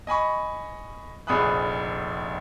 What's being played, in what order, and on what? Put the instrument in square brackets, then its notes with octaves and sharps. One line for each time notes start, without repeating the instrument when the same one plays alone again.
[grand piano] D#5 G#5 B5 C#6
F1 A#1 G#4 B5 D#6 F#6